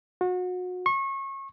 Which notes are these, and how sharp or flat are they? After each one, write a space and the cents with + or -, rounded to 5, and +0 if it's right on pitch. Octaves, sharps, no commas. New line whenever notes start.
F#4 -30
C#6 -30